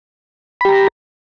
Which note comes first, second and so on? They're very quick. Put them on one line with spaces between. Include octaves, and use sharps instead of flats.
B5 G4 A#5